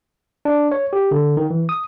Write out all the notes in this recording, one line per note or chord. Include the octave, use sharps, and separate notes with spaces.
D4
C#5
G4
D3
D#3
E3
D#6